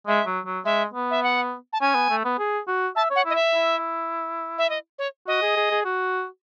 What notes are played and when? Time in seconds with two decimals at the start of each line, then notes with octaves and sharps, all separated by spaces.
0.07 G#3 E5
0.26 F#3
0.46 F#3
0.65 G#3 E5
0.94 B3
1.11 E5
1.23 F#5
1.73 A5
1.81 C#4 G#5
1.95 B3
2.10 A3
2.25 B3
2.39 G#4
2.68 F#4
2.96 E5 A5
3.10 C#5
3.16 F#5
3.25 E4 D#5
3.35 E5
3.55 E4
4.58 E5
4.70 D#5
4.99 C#5
5.27 F#4 D#5
5.42 G#4
5.57 G#4
5.71 G#4
5.85 F#4